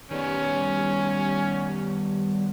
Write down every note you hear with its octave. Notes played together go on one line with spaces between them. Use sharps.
D#3 G3 B3 C#4